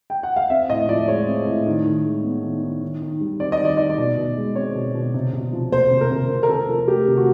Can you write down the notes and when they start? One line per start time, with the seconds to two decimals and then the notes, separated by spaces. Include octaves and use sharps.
0.10 G5
0.23 F#5
0.36 F5
0.50 C4 E5
0.69 A2 D#5
0.89 F3 D5
1.08 G#3 C#5
1.28 C4
1.47 A2
1.66 D#3
1.86 D#3
2.04 G#3
2.24 B3
2.43 D#3
2.63 D#3
2.83 D#3
3.02 D#3
3.21 G3
3.40 C4 D5
3.52 D#5
3.60 D#3
3.65 D5
3.77 D#3 D#5
3.90 D5
3.98 B2
4.18 B2
4.37 G#3
4.56 C4 C#5
4.75 B2
4.95 B2
5.14 C3
5.33 C3
5.53 F3
5.72 A#3 C5
5.91 C3
6.01 A#4
6.11 C3
6.30 C3
6.43 A#4
6.49 C3 A4
6.69 F3
6.88 A3 G4
7.08 C3
7.17 F#4